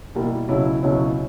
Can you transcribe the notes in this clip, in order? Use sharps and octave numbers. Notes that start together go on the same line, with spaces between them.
B2 G3 A#3 E4
C#2 B2 F#3 C#4 E4
C#2 B2 F#3 C#4 E4